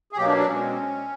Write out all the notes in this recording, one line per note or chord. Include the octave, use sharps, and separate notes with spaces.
G#4
B2 F#3 A#3 G4
D4
D4
B2 G#3 C4 C#4